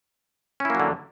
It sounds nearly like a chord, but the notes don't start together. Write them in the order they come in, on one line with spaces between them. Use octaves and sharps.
C#4 E4 A#3 F#3 D3